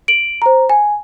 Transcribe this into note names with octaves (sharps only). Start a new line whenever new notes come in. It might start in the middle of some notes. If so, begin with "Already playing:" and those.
D7 F#7
C5 A#5
G#5